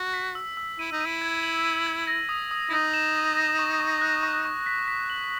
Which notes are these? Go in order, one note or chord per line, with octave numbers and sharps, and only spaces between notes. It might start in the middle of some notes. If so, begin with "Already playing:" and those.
Already playing: F#4
B6
E6
E6
E4 D#7
D#4
D#7
E4
G#6
F#7
D#7
G#6
A#6
D#6
D#6
E4
D#4 A#6
E7
A#6
A#6
C#6
C#6
F#6
C#6
C#6
B6
B6
F#7